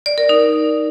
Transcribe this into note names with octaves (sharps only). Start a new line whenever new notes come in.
D5
A#4
D#4